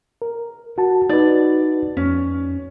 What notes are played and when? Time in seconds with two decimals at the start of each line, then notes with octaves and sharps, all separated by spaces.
0.22 A#4
0.78 F#4 A5
1.09 D#4 F#4 B4 D5
1.97 F2 C#4